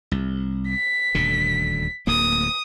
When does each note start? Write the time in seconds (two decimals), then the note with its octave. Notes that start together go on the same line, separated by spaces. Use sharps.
0.11 C2
0.68 B6
1.15 D#1 D2 D3
2.07 D1 D2 A#3 D#6